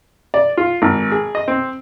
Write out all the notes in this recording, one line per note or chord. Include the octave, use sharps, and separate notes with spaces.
D5
F4
G#1
G#4
D#5
C4